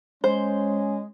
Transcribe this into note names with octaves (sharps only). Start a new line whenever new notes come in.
G#3 C#4 C5